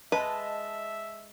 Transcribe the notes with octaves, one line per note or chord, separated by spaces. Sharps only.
G#3 B4 D#5 E5 A5